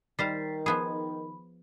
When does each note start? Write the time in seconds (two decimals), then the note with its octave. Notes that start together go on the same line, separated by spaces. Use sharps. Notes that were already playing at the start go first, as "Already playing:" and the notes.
0.19 D#3 G3 C5 F5 A6 B6 C7
0.66 F3 B3 G#4 B5